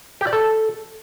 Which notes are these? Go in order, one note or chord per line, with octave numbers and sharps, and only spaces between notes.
G4
D5
A4